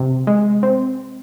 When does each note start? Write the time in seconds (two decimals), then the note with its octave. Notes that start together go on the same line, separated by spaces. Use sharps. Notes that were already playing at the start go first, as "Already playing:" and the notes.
Already playing: C3
0.27 G#3
0.63 C4